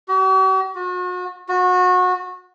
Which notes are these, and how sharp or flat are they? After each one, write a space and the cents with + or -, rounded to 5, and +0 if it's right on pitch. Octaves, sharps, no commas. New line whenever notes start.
F#4 +45
F#4 -40
F#4 -25